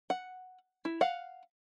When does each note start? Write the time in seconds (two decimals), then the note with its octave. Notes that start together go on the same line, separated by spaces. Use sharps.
0.10 F#5
0.85 E4
1.01 F5 F#5